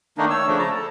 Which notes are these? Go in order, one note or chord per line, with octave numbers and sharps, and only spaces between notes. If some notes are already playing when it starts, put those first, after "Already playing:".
D#3 A3 A#3 D4 D#4
C#5 E6
C#3 F3 A3 D4
A5 A#5
A4